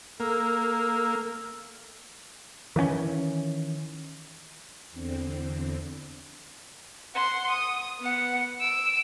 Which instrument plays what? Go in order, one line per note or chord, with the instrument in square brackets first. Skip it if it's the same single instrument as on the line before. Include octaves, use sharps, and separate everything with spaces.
[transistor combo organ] A#3 [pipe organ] A4 E6
[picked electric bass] D#3 E3 A#3 C#4
[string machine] E2 D3 C4
[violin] F#5 C6
D#6
B3 F#5
E6 D7